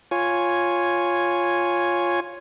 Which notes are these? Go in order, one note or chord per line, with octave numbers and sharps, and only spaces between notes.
F4 C#5 G#5